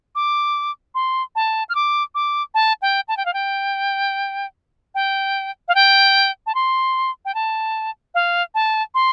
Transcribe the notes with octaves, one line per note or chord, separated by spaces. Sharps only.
D6
C6
A5
F6
D6
D6
A5
G5
A5
G5
F5
G5
G5
F5
G5
A5
C6
G5
A5
F5
A5
C6